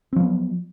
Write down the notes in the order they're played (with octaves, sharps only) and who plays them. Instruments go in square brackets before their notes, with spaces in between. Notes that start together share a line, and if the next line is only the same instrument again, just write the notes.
[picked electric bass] C4
F3
B3
F#3